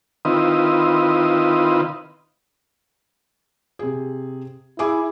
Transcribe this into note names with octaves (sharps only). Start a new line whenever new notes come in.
D#3 C4 E4 F4 B4 D#5
C3 G#4
E4 G#4 G#5 D6